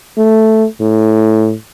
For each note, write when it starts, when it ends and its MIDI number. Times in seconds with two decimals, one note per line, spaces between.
0.18 0.65 57
0.80 1.53 45